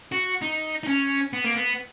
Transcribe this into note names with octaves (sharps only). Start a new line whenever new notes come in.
F#4
D#4
D#4
C#4
B3
A#3
B3